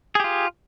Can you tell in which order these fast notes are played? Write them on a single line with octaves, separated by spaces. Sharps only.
G#4 G4 F4